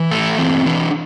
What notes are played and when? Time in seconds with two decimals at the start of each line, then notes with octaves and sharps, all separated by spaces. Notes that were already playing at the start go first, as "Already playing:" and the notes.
Already playing: E3
0.11 A3 A4
0.39 E3 C4
0.66 E3 D4